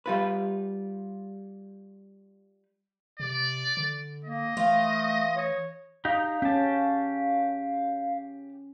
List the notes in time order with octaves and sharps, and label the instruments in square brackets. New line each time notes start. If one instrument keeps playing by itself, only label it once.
[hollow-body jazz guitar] G3 F4 B4
[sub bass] C3 [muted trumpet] D5
[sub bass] D3
[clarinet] A#3 [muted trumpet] D#5
[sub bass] E3 [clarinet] A3 [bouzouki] F4
[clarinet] C#5
[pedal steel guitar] D#4 G4 [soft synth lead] F5
[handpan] C#4 [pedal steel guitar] G4 A5